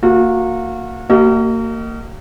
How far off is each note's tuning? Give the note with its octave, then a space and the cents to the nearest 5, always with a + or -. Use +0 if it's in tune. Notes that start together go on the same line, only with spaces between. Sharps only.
A#3 -20 F#4 -30
A#3 -30 F#4 +35 D#5 -5